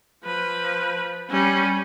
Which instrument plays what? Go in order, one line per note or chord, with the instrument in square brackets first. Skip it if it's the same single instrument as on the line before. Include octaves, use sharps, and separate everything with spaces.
[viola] F3 B4
G3 C#4